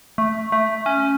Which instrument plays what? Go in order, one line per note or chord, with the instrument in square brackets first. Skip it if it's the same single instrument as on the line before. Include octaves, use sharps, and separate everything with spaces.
[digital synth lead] A3
A3
C#4